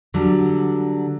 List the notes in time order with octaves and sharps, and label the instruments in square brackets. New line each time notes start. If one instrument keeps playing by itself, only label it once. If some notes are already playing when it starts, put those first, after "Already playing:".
[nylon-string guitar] D3 F#3 G3